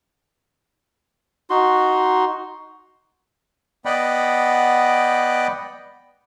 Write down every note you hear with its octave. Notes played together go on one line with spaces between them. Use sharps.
D#4 F#4 C6
B3 D5 D#5 F#5 G5 B5